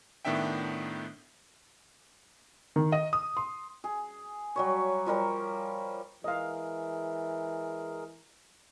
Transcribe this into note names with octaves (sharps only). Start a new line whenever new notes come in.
A2 D#3 B3 D4 E5 G5
D#3
D#5
D#6
C6
G#4
F#3 G3 C#5
F3 G3 A#4 C#5
E3 G#3 G#4 A#4 D#5 F5